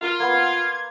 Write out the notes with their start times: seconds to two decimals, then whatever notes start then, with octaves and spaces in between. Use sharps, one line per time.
0.02 F4 A#4
0.20 A#3 B3 G#6
0.33 C5